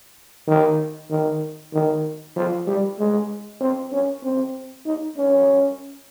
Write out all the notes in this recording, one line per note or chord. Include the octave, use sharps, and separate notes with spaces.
D#3
D#3
D#3
F3
G3
G#3
C4
C#4
C4
D#4
C#4